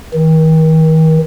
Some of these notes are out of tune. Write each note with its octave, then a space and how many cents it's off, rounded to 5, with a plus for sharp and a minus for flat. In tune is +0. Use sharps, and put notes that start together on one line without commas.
D#3 +40